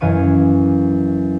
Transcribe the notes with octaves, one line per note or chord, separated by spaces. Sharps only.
F#2 E3 F5 C#6 D#7